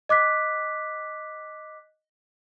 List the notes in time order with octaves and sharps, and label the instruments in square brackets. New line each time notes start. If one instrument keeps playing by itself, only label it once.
[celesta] D#5 D6 F#6 B6